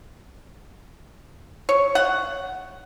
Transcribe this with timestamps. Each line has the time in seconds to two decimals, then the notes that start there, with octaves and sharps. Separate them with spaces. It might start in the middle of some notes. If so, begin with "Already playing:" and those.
1.69 C#5
1.95 F#5